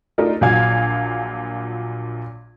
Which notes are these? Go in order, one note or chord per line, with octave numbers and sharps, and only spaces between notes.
A3 D4 D#4 F4 A#4
A#1 A#2 F#3 F5 G#6